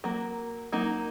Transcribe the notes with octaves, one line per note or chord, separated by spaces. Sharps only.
F#3 A#3
F#3 A#3 D#4